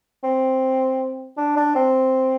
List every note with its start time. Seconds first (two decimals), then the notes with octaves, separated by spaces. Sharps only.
0.24 C4
1.37 D4
1.57 D4
1.75 C4